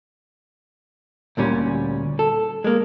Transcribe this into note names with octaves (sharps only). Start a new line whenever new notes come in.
D2 A#2 G3 C#4
A4
G#3 A#3